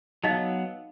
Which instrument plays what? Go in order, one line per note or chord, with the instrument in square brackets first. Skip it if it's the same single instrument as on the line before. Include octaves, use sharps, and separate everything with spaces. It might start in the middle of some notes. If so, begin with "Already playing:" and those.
[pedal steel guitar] F#3 B3 [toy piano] D#4 D#5 F5